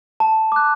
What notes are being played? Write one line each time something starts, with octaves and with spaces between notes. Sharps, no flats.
A5
D6 F#6